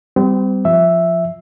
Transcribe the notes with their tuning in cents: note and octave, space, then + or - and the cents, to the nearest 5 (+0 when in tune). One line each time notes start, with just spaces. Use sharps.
G3 +0 C4 -35
F3 +0 E5 +0